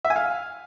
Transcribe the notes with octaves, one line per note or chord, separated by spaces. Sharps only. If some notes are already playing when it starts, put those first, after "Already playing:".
E5
G#5
F5